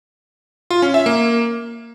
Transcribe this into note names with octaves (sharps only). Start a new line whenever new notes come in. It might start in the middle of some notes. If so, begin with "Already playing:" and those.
F4
C#4
E5
A#3